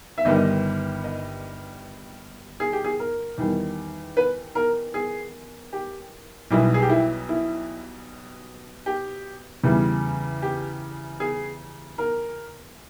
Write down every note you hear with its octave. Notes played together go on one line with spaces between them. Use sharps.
E5
G1 G2 D#3 G3 D#5
D#5
G#4
G4
G#4
A#4
E2 D#3 G3
B4
A#4
G#4
G4
B1 B2 G3 E4
G#4
G4
E4
E4
G4
E2 C#3 E3 G3
G4
G#4
A#4